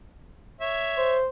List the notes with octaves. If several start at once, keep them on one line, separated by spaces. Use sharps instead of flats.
C#5 E5
C5